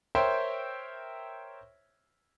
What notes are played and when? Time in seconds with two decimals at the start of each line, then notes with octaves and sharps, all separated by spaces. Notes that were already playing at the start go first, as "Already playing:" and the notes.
0.15 A#4 C5 C#5 E5 G5 C6